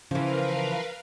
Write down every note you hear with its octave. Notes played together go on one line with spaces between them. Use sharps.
C#3 E3 F3 A#4 B4 F5